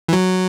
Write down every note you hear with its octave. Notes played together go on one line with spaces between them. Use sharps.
E3
F#3